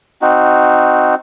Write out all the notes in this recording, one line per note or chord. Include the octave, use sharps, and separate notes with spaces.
C4 D#4 F#4